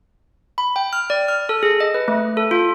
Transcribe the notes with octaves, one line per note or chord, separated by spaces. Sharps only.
B5
G5
F6
D5
F6
A4
G#4
D#5
B4
A3
A4
F4